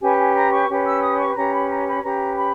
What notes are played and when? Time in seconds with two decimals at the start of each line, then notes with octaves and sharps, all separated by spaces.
0.01 C#4 G4 B4 G#5
0.18 G#5
0.34 A#5
0.51 C#6
0.68 C#4 G4 B4
0.85 E6
1.02 D#6
1.18 C#6
1.35 C#4 G4 B4 A#5
1.51 B5
1.69 A#5
1.86 B5
2.02 C#4 G4 B4 A#5
2.36 B5